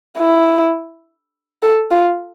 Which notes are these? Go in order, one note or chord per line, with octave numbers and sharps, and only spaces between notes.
E4
A4
F4